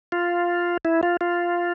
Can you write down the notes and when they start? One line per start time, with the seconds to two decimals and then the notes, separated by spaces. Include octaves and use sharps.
0.12 F4
0.85 E4
1.03 F4
1.21 F4